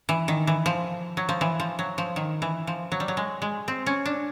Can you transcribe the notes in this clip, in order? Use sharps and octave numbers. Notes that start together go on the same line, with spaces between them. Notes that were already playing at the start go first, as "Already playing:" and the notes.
E3
D#3
E3
F3
F#3
F3
E3
F3
F#3
F3
D#3
E3
F3
F#3
G3
F#3
G#3
G#3
C4
C#4
D4